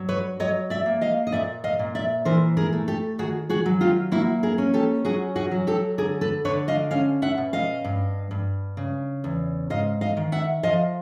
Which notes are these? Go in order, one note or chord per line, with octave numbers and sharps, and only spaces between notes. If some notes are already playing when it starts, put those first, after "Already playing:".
Already playing: G2 F#3
B4 C#5
F#3 C#5 D#5
D5 E5
A#3
D#5 F5
D#5
A#2 D5 E5
D#5 F5
A#2
D5 E5
E3 A#4 C5
G#4 A#4
A3
G4 A4
D#3 F#4 G#4
F#4 G#4
F#3
F4 G4
A#3 E4 F#4
G#4 A#4
C#4
G4 A4
F#3 F#4 G#4
F#4 G#4
F#3
G4 A4
D3 G#4 A#4
A4 B4
D3 B4 C#5
D#5 F5
C#4 D#5 F5
E5 F#5
B2
D#5 F5
G2
G2
C#3
E2
G#2 D#5 F5
D#5 F5
D#3
E5 F#5
F3 D#5 F5